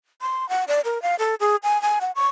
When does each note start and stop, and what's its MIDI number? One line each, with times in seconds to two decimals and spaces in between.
0.21 0.49 84
0.49 0.64 78
0.68 0.81 74
0.85 1.01 70
1.02 1.15 77
1.19 1.35 69
1.40 1.56 68
1.63 1.81 80
1.82 1.99 80
2.01 2.11 78
2.15 2.28 85